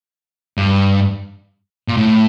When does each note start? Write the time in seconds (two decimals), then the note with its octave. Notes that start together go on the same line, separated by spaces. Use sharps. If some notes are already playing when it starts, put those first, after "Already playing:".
0.57 G2
1.88 A#2
1.97 A2